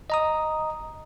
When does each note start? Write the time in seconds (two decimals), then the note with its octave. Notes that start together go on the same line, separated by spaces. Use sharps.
0.10 D#5 A#5 D#6